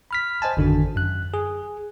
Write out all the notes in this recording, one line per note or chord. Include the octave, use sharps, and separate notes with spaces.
B5 F6 B6
C5 D#5 G#5 A5
G#1 F2 D3 D#3 D4 F#4
F#2 F#6
G#4